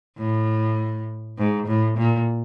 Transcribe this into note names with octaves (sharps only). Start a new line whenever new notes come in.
A2
G#2
A2
A#2